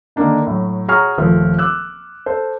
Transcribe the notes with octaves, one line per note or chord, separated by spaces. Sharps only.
D3 D#3 A#3 D4 D#4
A2 F#3
F#4 G#4 C#5 A#5 C#6 F6
D#1 F3 A3
D6 E6 F#6
A4 C5